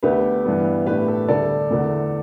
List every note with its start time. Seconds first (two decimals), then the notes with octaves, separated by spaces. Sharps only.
0.03 D2 D3 B3 D4 G4 B4
0.45 G2 E3 G3 B3
0.87 A2 A3 D4 G4 B4
1.08 A4
1.29 D2 D3 G3 D4 A4 D5
1.70 E2 D3 A3 D4